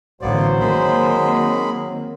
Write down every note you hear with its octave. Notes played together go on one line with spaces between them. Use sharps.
A1 D3 E3 F#3 A#3 B3 C5 D5
D#3 G#3 A#3 C4 G#4 B5